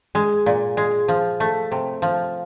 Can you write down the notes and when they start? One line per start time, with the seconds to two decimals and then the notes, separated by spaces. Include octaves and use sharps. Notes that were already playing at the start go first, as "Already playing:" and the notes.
0.15 G#3
0.46 A#2
0.77 G#3
1.08 F3
1.40 A3
1.72 C3
2.02 F3